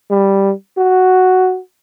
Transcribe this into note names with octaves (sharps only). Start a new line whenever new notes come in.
G3
F#4